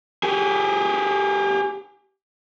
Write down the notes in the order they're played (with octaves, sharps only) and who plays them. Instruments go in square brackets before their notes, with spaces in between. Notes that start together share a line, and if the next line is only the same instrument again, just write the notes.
[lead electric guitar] G4 G#4